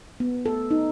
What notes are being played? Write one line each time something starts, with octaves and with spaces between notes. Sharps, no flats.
B3
A4
D#4